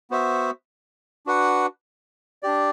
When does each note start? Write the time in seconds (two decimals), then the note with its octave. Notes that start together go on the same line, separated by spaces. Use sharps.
0.11 B3 F#4 C5 E5
1.26 D4 F#4 B4 F#5
2.43 D4 G4 D5